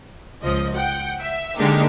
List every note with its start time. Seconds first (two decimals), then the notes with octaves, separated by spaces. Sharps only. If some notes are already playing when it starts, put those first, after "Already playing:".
0.42 C#2 F3 D#5
0.74 F#5 G5
1.20 E5 E6
1.57 D3 G#3 A#3 D4 D#4 G4